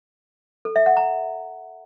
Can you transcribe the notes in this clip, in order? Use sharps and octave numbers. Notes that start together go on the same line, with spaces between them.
A4
E5
F#5
A#5